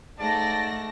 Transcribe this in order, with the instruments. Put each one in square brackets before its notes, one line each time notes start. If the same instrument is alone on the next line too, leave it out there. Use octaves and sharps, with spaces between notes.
[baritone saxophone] G#2 [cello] A3 [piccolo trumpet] D5 [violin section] A5 A#6